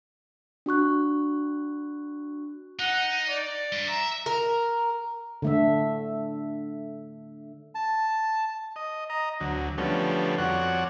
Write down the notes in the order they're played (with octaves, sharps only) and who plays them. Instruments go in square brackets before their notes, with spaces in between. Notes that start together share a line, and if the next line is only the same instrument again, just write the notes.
[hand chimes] D4 F#4 C#6 F#6
[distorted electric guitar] D#4 [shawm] F#5
[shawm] D5
[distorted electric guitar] G2
[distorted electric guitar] E5 [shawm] A#5
[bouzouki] A#4
[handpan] D3 A3 E5
[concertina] A5
[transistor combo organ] D#5
D#5 A#5
D2 F#3
D3 F3 G3 A3 B3 C#4
F2 F#4 C#5 D5 F#5